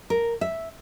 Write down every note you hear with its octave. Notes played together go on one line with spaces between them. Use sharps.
A#4
E5